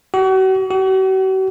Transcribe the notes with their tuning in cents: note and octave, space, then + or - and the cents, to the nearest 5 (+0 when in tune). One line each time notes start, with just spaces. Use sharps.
F#4 +40
F#4 +45